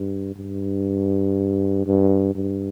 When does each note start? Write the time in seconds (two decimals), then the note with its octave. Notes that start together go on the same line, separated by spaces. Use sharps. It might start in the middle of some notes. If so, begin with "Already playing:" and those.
Already playing: G2
0.36 G2
1.86 G2
2.35 G2